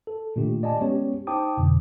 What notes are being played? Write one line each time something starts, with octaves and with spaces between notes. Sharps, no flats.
A4
A#2 D#3 A3 D4 G4
D5 D#5 G#5 A5
G#3 B3 C#4 G4 C#5
D#4 C5 G5 A5 D6 D#6
F2 B2 D3